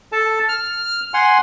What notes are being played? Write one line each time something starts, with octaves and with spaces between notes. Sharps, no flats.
A4 A5
F6
F#5 G#5 C6